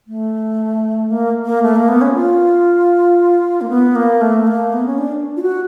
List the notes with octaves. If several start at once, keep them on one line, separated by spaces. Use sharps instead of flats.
A3
A#3
A#3
A3
A#3
B3
C#4
F4
A#3
B3
A#3
A3
A#3
B3
C#4
D4
F4
F#4